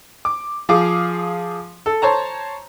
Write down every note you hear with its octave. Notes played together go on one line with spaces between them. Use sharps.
D6
F3 G#4 F5 D6
A4
C5 C#5 A5 A#5